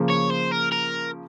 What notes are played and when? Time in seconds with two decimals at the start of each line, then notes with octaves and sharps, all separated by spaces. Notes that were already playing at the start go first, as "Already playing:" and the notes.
Already playing: C#3 F3 A#3
0.10 C#5
0.30 C5
0.52 A#4
0.72 A#4